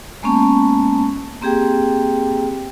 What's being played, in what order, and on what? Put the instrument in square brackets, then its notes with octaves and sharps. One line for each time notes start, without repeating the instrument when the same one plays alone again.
[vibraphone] G#3 A#3 B3 C#4 A5 C#6
A#3 C4 G4 G#4 G5